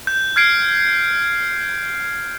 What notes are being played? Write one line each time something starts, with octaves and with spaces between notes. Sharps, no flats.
G6
F6 G#6 C7 D7